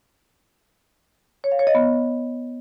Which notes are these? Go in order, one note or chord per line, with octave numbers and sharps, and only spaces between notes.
C#5
F5
C#5
D#5
B3